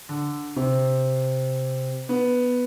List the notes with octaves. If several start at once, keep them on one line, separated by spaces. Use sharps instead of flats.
D3
C3
B3